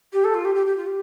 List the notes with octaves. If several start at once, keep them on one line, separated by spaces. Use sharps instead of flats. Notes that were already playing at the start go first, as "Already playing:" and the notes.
G4
A4
F4
G4
G4
G4
F4
G4